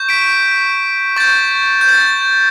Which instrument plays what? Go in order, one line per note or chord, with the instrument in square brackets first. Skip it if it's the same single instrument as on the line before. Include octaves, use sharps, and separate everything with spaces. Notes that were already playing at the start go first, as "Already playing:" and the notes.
Already playing: [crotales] C#6 G6
B6 D7
C#6 G6 A6
G6
A6